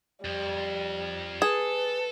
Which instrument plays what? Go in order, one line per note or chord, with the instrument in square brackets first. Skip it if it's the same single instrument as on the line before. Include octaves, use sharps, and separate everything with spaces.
[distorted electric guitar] F2 [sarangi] G3
[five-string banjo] G#4 [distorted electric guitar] A4 [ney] B4